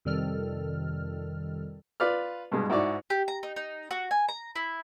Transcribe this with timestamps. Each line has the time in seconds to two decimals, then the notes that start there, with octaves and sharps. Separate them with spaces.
0.05 F2 C3 D#3 G3 A4 F6
2.00 F4 B4 D5 F6
2.52 G2 B2 G#3
2.70 G#2 E4 F#4 D5 C#6
3.10 G4
3.28 A#5
3.43 D#4
3.56 D#4
3.91 F#4
4.11 G#5
4.28 A#5
4.55 E4